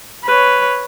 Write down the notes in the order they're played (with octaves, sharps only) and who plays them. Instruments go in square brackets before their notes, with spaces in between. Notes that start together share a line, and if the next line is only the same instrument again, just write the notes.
[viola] B4 C#5